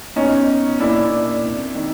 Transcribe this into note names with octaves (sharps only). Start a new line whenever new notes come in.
B2 C#4 D#4
A#2 D4 E4
C3
D#3